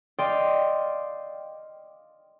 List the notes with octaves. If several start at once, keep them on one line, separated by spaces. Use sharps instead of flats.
D5 D#5 F5 G5 C6